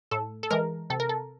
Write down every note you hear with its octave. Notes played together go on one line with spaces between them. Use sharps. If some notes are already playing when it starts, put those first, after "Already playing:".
A2 A4
A4
E3 G#3 A#4
C3 A4
A#4
A4